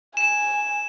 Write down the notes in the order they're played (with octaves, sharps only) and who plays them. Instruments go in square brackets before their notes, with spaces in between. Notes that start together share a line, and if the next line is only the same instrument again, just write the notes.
[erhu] G#5 [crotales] E7